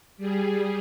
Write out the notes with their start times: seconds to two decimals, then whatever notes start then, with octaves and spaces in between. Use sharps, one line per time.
0.17 G3 G#4